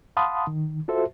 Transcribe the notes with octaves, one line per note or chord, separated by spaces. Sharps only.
F5 F#5 A5 B5 C6 D#6
D#3
F4 F#4 A4 C5 E5